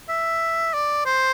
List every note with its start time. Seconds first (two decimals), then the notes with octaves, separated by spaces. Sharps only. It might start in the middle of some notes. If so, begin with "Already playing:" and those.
0.09 E5
0.74 D5
1.06 C5